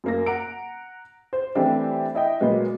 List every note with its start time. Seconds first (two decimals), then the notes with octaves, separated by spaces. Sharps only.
0.04 F#2 A#3 A#6
0.26 F#5 A#5 D7
1.33 C5
1.55 E3 G3 A3 C4 D4 G4
2.15 E4 D#5 G5
2.41 A#2 F#3 G#3 B3